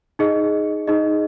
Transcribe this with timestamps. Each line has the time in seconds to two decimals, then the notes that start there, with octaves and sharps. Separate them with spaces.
0.19 D#4 G#4 D#5
0.87 D#4 G#4 D#5